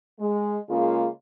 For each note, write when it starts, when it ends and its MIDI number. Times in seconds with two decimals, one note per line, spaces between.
0.20 0.57 56
0.69 1.07 49
0.69 1.07 56
0.69 1.07 58
0.69 1.07 65